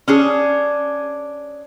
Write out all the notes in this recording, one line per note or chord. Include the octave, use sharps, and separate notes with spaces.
C#4 D4 G#4